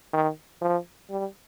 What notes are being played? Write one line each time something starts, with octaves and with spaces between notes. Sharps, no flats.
D#3
F3
G3